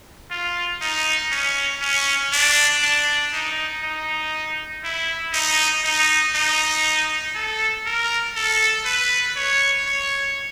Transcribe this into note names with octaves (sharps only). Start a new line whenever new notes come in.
F4
D#4
C#4
C#4
D4
D4
D#4
D#4
E4
D#4
D#4
D#4
A4
A#4
A4
B4
C#5
C#5